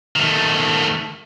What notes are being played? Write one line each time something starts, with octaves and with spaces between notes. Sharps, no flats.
D#3 A3